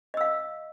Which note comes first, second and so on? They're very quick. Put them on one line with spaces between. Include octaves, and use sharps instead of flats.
D#5 E6 F5